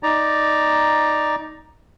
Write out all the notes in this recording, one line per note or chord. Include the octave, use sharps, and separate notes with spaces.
D#4 D5 A#5